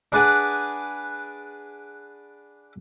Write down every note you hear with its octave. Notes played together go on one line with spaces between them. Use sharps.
D4 G#4 B4 D5 F#5 G#5